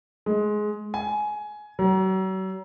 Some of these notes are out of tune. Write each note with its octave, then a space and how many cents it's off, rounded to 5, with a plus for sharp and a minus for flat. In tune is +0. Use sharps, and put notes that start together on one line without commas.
G#3 +15
G#5 +15
F#3 +40